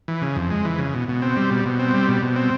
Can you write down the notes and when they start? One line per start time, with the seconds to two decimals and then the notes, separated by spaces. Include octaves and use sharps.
0.08 E3
0.22 C#3
0.36 F2
0.50 G#3
0.65 E3
0.79 C#3
0.94 B2
1.08 B2
1.22 C4
1.37 G3
1.51 B2
1.65 B2
1.79 C4
1.94 G3
2.08 B2
2.22 B2
2.36 C4